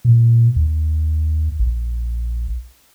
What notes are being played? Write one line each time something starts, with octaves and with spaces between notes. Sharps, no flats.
A#2
D#2
A#1